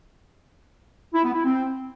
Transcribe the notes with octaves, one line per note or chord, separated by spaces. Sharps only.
E4
B3
E4
C4